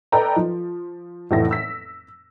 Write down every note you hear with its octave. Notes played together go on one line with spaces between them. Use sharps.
A4 B4 D5 D#5 G5 A#5
F3
F1 A2 E3 A4 A#6
E6 B6